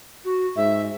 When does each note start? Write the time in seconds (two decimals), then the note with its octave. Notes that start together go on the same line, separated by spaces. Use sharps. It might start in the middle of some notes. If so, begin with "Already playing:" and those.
0.25 F#4
0.57 G#2 E5